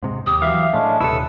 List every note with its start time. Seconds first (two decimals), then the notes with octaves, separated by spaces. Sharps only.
0.03 G#2 C3 G#3
0.26 D#2 G4 D#6
0.42 E3 F#3 E5 F5
0.73 A2 G#3 A3 C#4 D4
1.00 D#1 C3 E4 A4 B4 D#6 E6